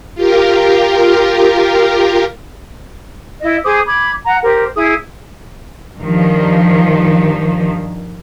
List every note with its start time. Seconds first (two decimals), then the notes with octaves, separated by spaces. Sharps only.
0.15 F4 G4 A#4
3.41 E4 D#5
3.64 G#4 C5 D6 D#6
3.86 B5 D6 G#6
4.25 F#5 A#5
4.43 G4 A#4 C5
4.74 E4 G#4 D#6
5.98 G2 D#3 F3